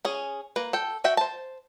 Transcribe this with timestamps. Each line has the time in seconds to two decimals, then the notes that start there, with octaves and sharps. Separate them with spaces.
0.05 C#4 G#4
0.56 A#3 B4
0.73 A4 G5
1.04 F#4 E5 G5
1.17 C5 A5